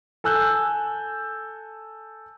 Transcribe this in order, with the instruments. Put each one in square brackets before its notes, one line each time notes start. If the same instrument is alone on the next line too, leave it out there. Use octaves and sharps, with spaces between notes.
[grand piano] A4 G#5 E6 F#6 G6